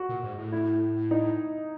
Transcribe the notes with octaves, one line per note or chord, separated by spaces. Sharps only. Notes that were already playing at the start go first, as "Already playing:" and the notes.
Already playing: F#4
A#2
G#2
A2
E4
D#4